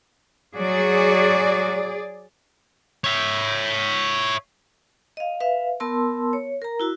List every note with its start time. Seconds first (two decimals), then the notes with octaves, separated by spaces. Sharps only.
0.57 F#3 F#4 G#4 D5
3.04 C#5 E5
5.17 D#5 F5
5.40 B4 E5 F5
5.80 B3 A#4 A5 C6 E6
6.33 C#5
6.62 A#4 A#5
6.80 E4 F#4 E6